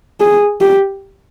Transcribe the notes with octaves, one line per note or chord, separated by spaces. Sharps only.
G#4
G4